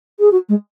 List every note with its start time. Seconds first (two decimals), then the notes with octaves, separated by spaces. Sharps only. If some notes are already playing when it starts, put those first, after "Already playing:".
0.20 G#4
0.32 F#4
0.49 G#3